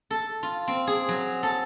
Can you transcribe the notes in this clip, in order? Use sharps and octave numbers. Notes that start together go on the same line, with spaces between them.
A4
F4
C4
G#4
F#3
A4